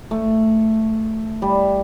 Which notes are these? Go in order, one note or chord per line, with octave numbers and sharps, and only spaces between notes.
A3
G3